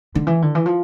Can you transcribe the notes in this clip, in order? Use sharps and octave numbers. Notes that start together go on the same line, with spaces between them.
D3
E3
D3
E3
F3